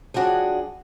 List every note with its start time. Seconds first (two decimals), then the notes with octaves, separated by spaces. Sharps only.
0.14 F3 G3 D4 F#4 G#4 C#5